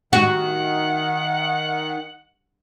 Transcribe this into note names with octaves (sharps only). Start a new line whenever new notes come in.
D#3 F#4 F#5